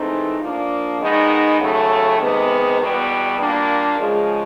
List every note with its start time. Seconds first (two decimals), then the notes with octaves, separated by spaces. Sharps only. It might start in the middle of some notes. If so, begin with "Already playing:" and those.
Already playing: G#2 E3 A3 C4 D#4
0.39 F3 A#3 D4
0.99 D#3 G#3 B3 D#4
1.59 D#2 C#3 F#3 A3
2.18 C3 D#3 G#3 B3
2.79 E2 B2 G3 B3
3.38 A#2 G3 A#3 D4
3.99 C#3 F3 G#3